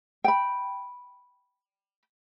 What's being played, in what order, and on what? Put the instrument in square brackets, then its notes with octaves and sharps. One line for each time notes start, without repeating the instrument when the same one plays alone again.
[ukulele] G5 B5